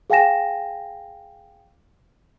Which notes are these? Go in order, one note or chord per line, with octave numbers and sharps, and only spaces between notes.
G#4 F5 G5 G#5 A#6 E7